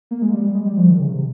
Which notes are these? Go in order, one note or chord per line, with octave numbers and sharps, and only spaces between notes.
A#3
G#3
G3
G3
G#3
G3
F3
D#3
C#3
C3